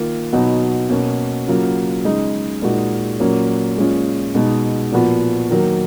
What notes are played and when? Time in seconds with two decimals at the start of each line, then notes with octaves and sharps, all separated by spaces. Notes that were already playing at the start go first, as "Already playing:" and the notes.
Already playing: D#3 A#3 F4
0.33 B2 F#3 B3 D#4
0.89 B2 A#3 C#4
1.47 C#3 F#3 A#3 F4
2.05 C#3 G#3 D#4
2.62 A#2 G#3 D#4 F#4
3.20 A#2 F#3 A#3 C#4
3.77 A#2 G#3 C#4 F4
4.35 B2 G#3 D#4
4.92 A#2 F3 B3 F#4
5.49 D#3 F#3 A#3